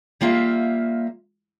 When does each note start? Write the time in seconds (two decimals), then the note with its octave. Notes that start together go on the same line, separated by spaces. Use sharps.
0.21 G3 A#3 F4 E5